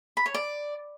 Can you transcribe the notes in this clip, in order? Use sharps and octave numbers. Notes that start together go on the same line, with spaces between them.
B5
C#5
D5